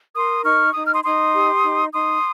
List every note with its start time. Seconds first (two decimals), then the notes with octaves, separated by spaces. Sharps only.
0.15 A#4 C6 D#6
0.44 D#4 C#6 F6
0.74 D#4 D#6
0.84 F6
0.93 C6 D#6
1.04 D#4 C6 D#6
1.33 G4
1.63 D#4
1.93 D#4 C6 D#6